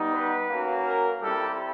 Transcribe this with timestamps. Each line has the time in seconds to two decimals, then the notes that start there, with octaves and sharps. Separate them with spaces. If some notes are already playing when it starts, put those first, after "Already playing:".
Already playing: G3 B3 D#4
0.13 B4
0.49 A#3 C#4 F#4
0.85 A#4
1.22 G3 C4 E4 G4 A4